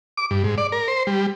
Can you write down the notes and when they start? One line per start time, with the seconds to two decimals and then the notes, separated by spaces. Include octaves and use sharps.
0.17 D6
0.31 G2
0.44 G#2
0.58 D5
0.72 A#4
0.88 C5
1.07 G3